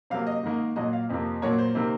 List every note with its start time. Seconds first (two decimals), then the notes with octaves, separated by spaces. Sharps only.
0.10 C3 F#3 A#3 F5
0.27 D#5
0.43 G#2 D#3 A#3
0.76 A#2 F#3 A#3 D#5
0.93 F5
1.09 F2 C3 F3 A#3
1.42 A#2 F#3 A#3 C#5
1.59 C5
1.75 C3 D#3 A#3